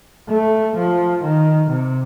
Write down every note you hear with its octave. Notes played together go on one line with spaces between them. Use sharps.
A3
F3
D#3
C3